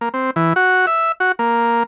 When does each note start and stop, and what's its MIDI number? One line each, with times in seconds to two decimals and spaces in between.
0.01 0.09 58
0.14 0.31 60
0.36 0.53 52
0.56 0.86 66
0.87 1.12 76
1.20 1.32 66
1.39 1.83 58